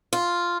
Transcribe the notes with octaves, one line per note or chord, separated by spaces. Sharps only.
F4